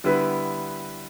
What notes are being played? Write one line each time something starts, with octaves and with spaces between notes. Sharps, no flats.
D3 G3 B3 E4 B4